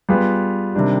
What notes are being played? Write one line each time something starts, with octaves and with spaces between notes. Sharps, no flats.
G3 B3 F4 G#4 B4
C3 D#3 G3 D4 G4